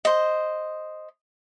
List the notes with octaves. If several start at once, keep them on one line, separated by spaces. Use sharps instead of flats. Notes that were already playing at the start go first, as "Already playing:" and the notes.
C5 D#5